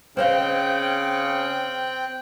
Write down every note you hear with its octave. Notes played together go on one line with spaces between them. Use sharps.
C#3 C4 C5 D#5 F5 G5 F#6